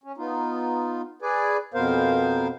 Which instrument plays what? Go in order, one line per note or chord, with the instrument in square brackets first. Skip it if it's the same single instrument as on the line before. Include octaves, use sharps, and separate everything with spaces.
[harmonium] C#4
B3 D#4 F4
G#4 B4 D5 G#5
F2 B2 B3 A#4 C5 F5